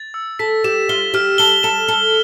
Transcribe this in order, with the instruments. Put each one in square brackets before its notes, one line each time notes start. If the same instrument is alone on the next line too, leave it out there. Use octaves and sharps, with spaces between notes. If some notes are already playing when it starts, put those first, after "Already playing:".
Already playing: [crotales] A6
E6
[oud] A4 [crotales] B6
[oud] G4 [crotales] E7
[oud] F4 [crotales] G7
[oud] G4 [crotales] F6
[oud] A4 [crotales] G7
[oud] A4 [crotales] E7
[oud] A4 [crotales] E7